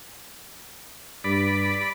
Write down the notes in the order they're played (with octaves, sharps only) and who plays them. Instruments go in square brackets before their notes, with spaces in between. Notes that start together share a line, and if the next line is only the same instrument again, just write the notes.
[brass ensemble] G2 [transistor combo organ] D5 B5